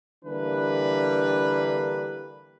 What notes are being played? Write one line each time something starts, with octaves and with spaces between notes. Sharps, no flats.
D3 E3 G3 A#3 D4 B4